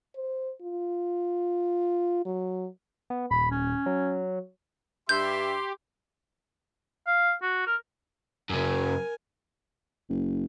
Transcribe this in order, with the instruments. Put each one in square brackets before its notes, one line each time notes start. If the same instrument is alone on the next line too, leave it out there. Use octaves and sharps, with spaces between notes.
[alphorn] C5
F4
F#3
[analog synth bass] B3
[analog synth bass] D#1 [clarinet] B5
[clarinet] C#4
[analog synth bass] F#3
[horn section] G2 E5 [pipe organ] G4 [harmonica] C6 [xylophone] G6
[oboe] F5
F#4
A#4
[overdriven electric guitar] F#2 C#3 [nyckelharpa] A#4 G#5
[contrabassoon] F#1